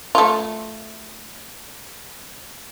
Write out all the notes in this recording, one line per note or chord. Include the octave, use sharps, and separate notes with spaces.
A3 F4